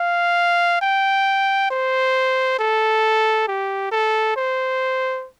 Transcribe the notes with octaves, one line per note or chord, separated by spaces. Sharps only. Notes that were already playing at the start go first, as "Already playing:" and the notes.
Already playing: F5
G5
C5
A4
G4
A4
C5